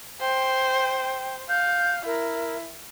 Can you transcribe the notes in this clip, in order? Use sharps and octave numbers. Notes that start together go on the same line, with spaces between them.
C5 G5
F5 G6
E4 A#4